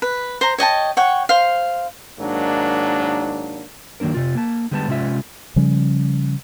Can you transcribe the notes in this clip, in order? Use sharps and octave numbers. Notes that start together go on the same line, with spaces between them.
B4
C5 A#5
C#5 D#5 G5 A5
C#5 F#5 G5 C#6
C5 F5
G#2 D#3 F#3 A#3 D4
D#3 F#3 A#3 D4 A#4
C3 F4
A#3 A5
D3 G3 G#3 B3 F#4 A5
C3 G#3 C#4 F4 E5
C#3 F3 G3 C#4